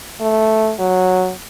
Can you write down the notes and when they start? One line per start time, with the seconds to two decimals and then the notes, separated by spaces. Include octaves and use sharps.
0.21 A3
0.79 F#3